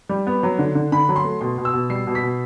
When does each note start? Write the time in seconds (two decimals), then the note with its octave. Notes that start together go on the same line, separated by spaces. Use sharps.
0.09 G3
0.27 B3
0.43 F#3
0.59 D3
0.75 D3
0.92 D3 B5
1.09 F#3
1.16 C6
1.24 A3
1.41 B2 C6
1.58 B2
1.65 E6
1.73 B2
1.90 G3 C7
2.07 B2
2.15 B6
2.23 B2